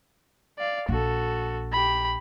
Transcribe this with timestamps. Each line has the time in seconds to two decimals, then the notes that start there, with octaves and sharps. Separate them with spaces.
0.59 D5 F5
0.89 A#1 F#4 A4
1.72 G4 B5